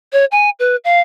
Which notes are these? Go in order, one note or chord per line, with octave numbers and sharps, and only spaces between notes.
C#5
G#5
B4
F5